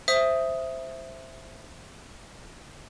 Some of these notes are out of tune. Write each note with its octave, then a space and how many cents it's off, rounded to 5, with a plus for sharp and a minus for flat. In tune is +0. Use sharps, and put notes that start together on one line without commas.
C5 +0 E5 +0 D#6 +5